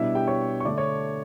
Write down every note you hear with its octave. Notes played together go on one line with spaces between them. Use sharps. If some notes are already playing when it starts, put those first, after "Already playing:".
Already playing: B2 G3 D4 E4 E5
G4 G5
C#5 C#6
C#6
D3 A3 D4 D5 D6
C#5 C#6